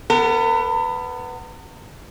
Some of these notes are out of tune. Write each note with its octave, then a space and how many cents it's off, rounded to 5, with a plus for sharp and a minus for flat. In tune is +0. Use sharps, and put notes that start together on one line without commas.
B3 +10 A#4 -45